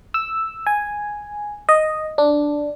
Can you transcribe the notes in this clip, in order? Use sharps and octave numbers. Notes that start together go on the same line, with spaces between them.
E6
G#5
D#5
D4